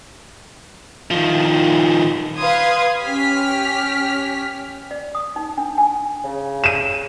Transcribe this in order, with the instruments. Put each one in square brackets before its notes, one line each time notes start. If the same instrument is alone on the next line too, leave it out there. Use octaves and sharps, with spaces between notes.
[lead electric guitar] D#3 F3
[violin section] B4 F5 C6 D#6 G#6
C#4 G4 F6 B6
[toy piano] D5
D#6
D#4
D4
G#5
[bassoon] C#3
[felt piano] D#7 E7